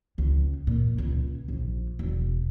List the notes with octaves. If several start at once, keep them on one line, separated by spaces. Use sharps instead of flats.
C#2
A#2
C#2
A#1
E1